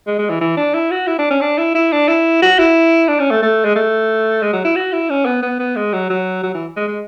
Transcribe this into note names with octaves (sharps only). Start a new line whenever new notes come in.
G#3
G#3
E3
E3
D4
E4
F#4
E4
D4
C#4
D4
E4
E4
D4
E4
F#4
E4
D4
C#4
A3
A3
G#3
A3
G#3
F#3
E4
F#4
E4
C#4
B3
B3
B3
G#3
F#3
F#3
F#3
E3
G#3
G#3